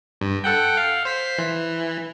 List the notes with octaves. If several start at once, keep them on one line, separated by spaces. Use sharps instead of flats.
G2
A4 F#5 G5
F5
C5 B6 C7
E3